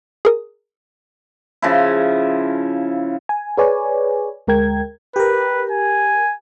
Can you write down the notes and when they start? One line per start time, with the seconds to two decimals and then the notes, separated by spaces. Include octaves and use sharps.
0.25 G#4 A#4 D#6
1.62 C#3 F3 E4
3.29 G#5
3.57 G#4 B4 C#5 D5 G#5
4.47 D2 G#3 A#4 G5 G#6
5.16 G4 A#4 B4
5.71 G#5